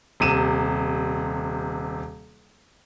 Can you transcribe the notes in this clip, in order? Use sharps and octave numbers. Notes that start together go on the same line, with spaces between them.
D#1 C3 D#7 E7